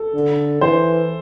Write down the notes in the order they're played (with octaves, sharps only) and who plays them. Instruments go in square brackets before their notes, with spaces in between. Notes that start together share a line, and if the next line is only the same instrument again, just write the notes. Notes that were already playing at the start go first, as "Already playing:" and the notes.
Already playing: [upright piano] A4
[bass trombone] D3
[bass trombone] E3 [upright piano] C5